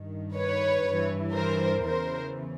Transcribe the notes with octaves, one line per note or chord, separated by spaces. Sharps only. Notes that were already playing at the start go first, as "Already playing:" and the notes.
Already playing: G2 D#3
B4 C#5
G2
E3
A#4 C5
E2 C#3 E3 A#4 C5